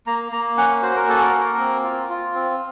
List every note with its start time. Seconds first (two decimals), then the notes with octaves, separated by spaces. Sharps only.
0.07 A#3 A#5
0.32 A#3 A#5
0.58 C#4 F#5
0.82 F#4 C5
0.96 A#4
1.08 A#3 A4
1.21 A#4
1.33 A#3
1.58 C4
1.84 F4
2.09 F4
2.35 C4